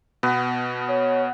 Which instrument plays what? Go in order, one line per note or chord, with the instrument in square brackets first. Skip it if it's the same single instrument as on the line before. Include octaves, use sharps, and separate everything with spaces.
[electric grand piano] B2 [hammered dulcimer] B3
[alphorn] C#5